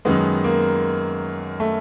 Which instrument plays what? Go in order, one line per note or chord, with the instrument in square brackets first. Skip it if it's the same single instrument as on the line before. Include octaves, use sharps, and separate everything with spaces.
[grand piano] F#2 D#3 G#3 B3
A#3
A3